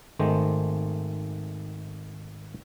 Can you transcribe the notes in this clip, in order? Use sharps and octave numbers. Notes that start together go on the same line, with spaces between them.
G#1 D#3 G#3 A3 C5